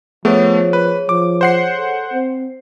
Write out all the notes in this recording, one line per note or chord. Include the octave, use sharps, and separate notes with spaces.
F3 A3 B3 G#4 C#5
B4
F3 D6
C5 F#5 C7
A4
C4